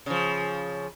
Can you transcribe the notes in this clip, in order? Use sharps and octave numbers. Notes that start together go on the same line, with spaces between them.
C#3 F3